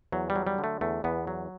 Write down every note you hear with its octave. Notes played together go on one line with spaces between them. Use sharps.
E2 F#3
G3
F#3
G3
D3
A3
E2 A3
E2 B3
F#3